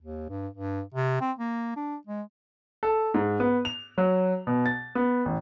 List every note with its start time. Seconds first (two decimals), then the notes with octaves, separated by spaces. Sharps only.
0.01 D#2
0.29 G2
0.54 G2
0.94 C3
1.21 C4
1.39 A#3
1.76 D4
2.07 G#3
2.83 A4
3.14 G#2
3.40 B3
3.65 F7
3.98 F#3
4.47 B2
4.66 A6
4.95 B3
5.25 A1